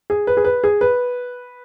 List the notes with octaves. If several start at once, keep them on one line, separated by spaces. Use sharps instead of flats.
G#4
B4
G#4
B4
G#4
B4